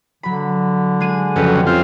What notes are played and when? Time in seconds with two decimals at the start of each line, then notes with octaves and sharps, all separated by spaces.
0.23 D3 F#3 B5
1.00 G#3 G#4 D#7
1.36 F2 C#3 F#3 G4 B4
1.67 C4 C#4 F4